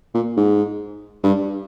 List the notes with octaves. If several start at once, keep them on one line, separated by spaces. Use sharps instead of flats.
A#2
G#2
G2